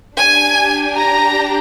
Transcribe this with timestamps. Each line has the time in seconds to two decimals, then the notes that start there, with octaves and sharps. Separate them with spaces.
0.18 D4 G4 G#5
0.97 A#5